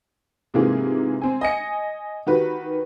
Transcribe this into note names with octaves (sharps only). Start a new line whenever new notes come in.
G#2 C3 E3 A#3 F4 G#4
C4 G#5
D#5 G#5 C#7
D#3 F#4 G4 B4